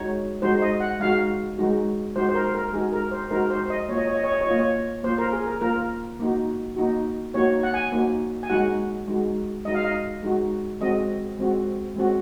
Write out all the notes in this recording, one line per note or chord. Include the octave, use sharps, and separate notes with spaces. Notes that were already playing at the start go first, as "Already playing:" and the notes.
Already playing: G#3 D#4 F#4 C#5
G#3 D#4 F#4 C5
D#5
F#5
G#3 D#4 F#4 F5
G#3 D#4 F#4
G#3 D#4 F#4 C5
C5
A#4
A#4
G#3 D#4 F#4 G#4
A#4
C5
G#3 D#4 F#4 A#4
C5
D#5
A#3 F4 C#5
D#5
C#5
D#5
C#5
D#5
C#5
A#3 F4 D#5
C#5
A#3 F4 C5
A#4
G#4
A#4
A#3 F4 A#4
A#3 D#4 F#4
A#3 D#4 F#4
A#3 D#4 F#4 C#5
F#5
G#5
A#3 D#4 F#4
G#5
G#3 D#4 F#4 F#5
G#3 D#4 F#4
G#3 D#4 F#4 D#5
F5
D#5
G#3 D#4 F#4
G#3 C4 F#4 D#5
G#3 C4 F#4
G#3 C4 F#4